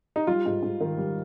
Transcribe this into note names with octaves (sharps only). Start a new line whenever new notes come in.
D#4
G3 F4
G#2
G#2
D#3
G3